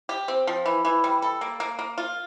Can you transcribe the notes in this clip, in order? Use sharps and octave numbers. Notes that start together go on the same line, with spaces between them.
G4
C4
F3
E3
E3
G3
A4
A#3
A#3
A#3
F4